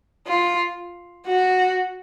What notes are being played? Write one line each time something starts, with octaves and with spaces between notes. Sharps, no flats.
F4
F#4